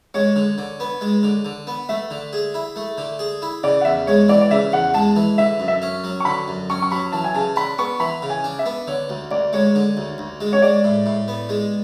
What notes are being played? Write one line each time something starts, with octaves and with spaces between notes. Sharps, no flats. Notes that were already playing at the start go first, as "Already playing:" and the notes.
G#3 C#5
D3
D3
B3
G#3
D3
D3
B3
A3 E5
D3
G#4
E4
A3
D3
G#4
E4
C#3 D5
F#5
E2 E5
G#3 C#5
E3 D5
D5
C#3 E5
E2 F#5
G#3 A5
E3
D3 E5
F#2
E5
C#4
F#3
C#6
D3 B5
F#2
C#4 C#6
C#6
F#3 B5
E3 A5
G#5
C#3 A5
D4 B5
B3 C#6
E3 B5
C#3
G#5
D4
E5
B3
D3 C#5
D2
D2 D5
G#3 C#5
D3
D2
D2
G#3
C#5
G#3 D5
A2
A2
B3
G#3